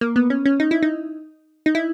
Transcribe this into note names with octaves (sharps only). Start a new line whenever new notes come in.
A#3
B3
C#4
C#4
D#4
E4
D#4
D#4
E4